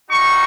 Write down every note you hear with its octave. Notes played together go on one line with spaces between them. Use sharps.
G3 A#3 D#4 F#4 C#6